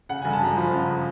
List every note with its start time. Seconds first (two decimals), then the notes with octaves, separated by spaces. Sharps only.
0.09 C#3 F#5
0.22 G1 G#5
0.33 A5
0.41 F#2 A#5
0.56 F3 B5
0.72 C#3